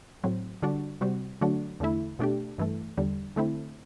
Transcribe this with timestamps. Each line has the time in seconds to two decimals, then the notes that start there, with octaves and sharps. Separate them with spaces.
0.24 A2 F#3 C4
0.62 D3 G3 D4 F#4
1.01 C3 G3 C4 F#4
1.41 D3 F#3 A3 D4 F#4
1.80 E2 D3 A3 E4
2.19 B2 A3 D4 G4
2.58 G2 E3 A3
2.98 E2 D3 G3
3.36 D3 A3 C4 E4